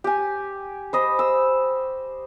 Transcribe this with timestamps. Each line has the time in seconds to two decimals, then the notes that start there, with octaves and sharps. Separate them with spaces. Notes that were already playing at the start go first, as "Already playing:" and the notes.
0.04 G4 G#5
0.93 C5 D#5 B5
1.19 E6